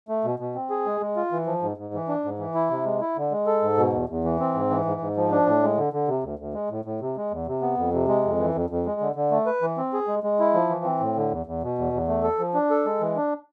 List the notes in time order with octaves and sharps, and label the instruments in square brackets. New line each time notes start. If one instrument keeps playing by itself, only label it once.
[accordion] A3
B2
B2
C4
G#4
G#3
G#3
F4
E3
F3
G#2
G#2
E3
D4
G#2
E3
E4
C3
G#3
E4
D3
G#3
A4
G#2
B2
E2
E2
E3
C4
G#2
E3
G#2
G#2
F3
D4
A2
G#3
D3
D3
C3
D2
D2
G#3
A2
A2
C3
G#3
E2
C3
B3
F2
C3
G#3
F2
E3
F2
F2
G#3
D3
D3
A3
B4
E3
C4
G#4
G#3
G#3
E4
F3
E3
C4
A2
D3
E2
E2
B2
E2
E2
A3
A4
F3
D4
A4
G#3
E3
D4